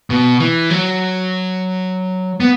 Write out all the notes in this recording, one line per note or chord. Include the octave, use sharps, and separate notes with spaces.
B2
E3
F#3
B3